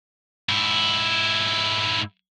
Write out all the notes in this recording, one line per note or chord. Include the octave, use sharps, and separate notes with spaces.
G#2 E4